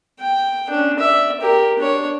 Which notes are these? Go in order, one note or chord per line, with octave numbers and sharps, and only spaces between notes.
G5
C#4 D4
D5 E5
G4 A#4
D4 C#5